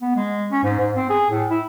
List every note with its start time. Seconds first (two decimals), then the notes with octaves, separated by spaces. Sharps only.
0.02 B3
0.16 G#3
0.52 C#4
0.64 G#2
0.79 G#2
0.95 C4
1.10 G#4
1.30 A2
1.51 E4